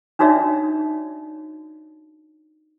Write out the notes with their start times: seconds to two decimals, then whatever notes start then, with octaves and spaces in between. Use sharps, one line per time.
0.19 D4 D#4 F#4 C#5 D5 E5